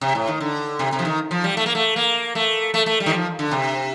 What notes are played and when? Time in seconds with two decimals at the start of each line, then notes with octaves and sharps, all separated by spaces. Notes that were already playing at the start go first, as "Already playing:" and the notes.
0.01 C3
0.15 A2
0.27 D#3
0.41 D3
0.79 C3
0.92 C3
0.99 F3
1.05 D#3
1.31 F3
1.44 G3
1.57 A3
1.66 A#3
1.75 A3
1.96 A#3
2.35 A3
2.74 A3
2.86 A3
3.00 G3
3.06 D#3
3.13 F3
3.39 D3
3.51 C3